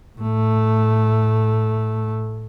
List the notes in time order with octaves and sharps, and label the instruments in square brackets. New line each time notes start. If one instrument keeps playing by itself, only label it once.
[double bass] A2 A3